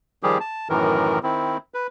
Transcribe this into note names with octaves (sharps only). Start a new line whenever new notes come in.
D#3 F3 G3 G4 G#4
A5
F#2 A2 D#3 E3 A#4
D#3 C4 E4
B4